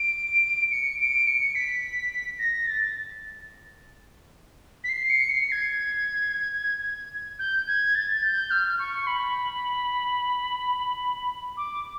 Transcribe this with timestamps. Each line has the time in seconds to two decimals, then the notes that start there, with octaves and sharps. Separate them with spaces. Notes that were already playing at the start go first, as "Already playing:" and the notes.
Already playing: D7
0.71 C#7
1.00 D7
1.27 C#7
1.55 B6
2.39 A#6
2.67 A6
4.84 B6
4.89 C7
5.10 C#7
5.30 C7
5.52 G#6
7.39 G6
7.68 G#6
7.95 A6
8.23 G6
8.51 F6
8.79 C#6
9.07 B5
11.57 D6